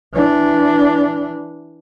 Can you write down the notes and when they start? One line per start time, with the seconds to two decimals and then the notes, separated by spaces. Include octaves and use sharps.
0.14 E3 D4